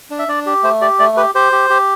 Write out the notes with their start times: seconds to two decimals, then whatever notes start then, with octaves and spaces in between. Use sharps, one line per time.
0.11 D4
0.19 E5
0.28 D4 D5
0.46 G4
0.63 A3 C5
0.81 G4 D5
0.99 A3 D5
1.17 G4 B4
1.35 G4 C5
1.52 G4
1.70 G4